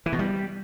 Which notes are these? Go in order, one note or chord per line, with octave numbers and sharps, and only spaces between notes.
E3
B2
G3